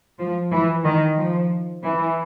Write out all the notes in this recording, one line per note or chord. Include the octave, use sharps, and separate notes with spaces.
F3
E3
D#3
F3
E3